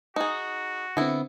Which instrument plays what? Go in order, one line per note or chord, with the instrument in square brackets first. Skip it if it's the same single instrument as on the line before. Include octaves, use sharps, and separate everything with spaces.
[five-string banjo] D#4 G#4 [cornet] F#4
[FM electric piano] D3 C4 [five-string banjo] B3 E4